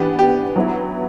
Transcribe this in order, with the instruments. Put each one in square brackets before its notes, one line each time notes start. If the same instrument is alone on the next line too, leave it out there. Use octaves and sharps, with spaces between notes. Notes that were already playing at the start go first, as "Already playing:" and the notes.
Already playing: [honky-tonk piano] E3 B3 D4 [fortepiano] G4
[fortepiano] G4
[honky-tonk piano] F#3 B3 E4